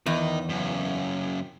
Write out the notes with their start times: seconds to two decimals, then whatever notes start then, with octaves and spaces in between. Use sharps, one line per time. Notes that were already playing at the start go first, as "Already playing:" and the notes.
0.06 E2 D#3 D#4
0.49 F#2 C#3